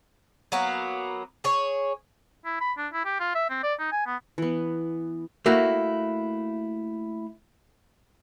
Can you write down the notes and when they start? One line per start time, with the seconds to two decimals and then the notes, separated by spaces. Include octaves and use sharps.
0.52 F#3 A#3 B3
1.44 G#4 C#5
2.45 E4
2.61 B5
2.78 D4
2.93 E4
3.05 G4
3.20 F4
3.35 E5
3.50 C4
3.63 D5
3.79 D#4
3.92 G#5
4.06 B3
4.38 E3 B3
5.46 A3 A#3 E4 F#4